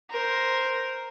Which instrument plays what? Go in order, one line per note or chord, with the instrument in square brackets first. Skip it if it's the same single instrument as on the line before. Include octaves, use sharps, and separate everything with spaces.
[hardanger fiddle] A#4 C5